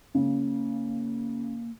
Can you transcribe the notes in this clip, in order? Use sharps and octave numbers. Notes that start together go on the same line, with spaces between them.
C#3 A#3